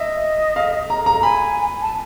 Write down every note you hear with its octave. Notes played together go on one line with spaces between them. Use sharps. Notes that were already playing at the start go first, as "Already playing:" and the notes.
Already playing: D#5 E5
F5
A#5
A#5
G#5 B5
A5